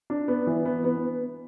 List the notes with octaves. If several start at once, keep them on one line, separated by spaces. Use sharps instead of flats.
D4
B3
E3
B3
B3